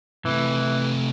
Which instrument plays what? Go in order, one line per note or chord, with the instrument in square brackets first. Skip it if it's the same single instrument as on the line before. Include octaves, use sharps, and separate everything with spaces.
[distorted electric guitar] C3 A3 [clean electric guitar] E3